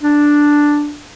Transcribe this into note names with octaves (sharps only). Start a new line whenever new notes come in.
D4